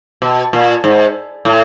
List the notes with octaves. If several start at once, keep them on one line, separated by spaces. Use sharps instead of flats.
B2
A#2
G#2
A2